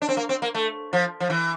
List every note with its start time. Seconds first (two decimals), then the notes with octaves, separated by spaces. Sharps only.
0.02 D4
0.09 C4
0.17 A#3
0.29 C4
0.42 A#3
0.54 A3
0.93 F3
1.20 F3
1.30 E3